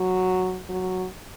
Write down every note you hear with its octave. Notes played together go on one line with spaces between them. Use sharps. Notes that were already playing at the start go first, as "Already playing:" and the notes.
Already playing: F#3
F#3